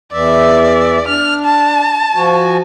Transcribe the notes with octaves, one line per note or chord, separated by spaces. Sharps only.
E2 E3 D5 E5
D4 F6
A5
F3 F#4 G#5